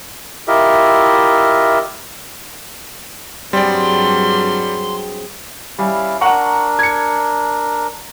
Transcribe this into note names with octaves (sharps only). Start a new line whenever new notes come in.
E4 F4 G4 A#4 D#5 E5
G2 F#3 G3 C4 G#4 D5 C6
G3 C#4 E4 F5
D4 A#4 F#5 A#5 C#6
G#6 C#7